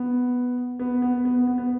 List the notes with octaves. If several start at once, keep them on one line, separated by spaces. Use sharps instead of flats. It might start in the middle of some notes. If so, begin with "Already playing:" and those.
Already playing: B3
B3
B3
B3
B3
B3